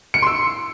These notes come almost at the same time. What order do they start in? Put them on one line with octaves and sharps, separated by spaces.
C#7 D7 C6 E6